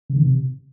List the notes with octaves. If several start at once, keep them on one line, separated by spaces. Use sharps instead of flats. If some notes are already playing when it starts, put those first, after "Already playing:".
C#3
D#3
C3